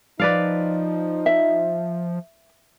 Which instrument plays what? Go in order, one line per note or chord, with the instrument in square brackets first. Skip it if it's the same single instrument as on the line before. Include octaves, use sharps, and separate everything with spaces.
[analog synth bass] F3 [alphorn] D#4 [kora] B4 D5 F5
[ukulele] E5